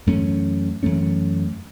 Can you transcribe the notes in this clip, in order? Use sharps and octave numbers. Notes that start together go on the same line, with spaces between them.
F#2 E3 A3 C#4
F#2 E3 A3 C#4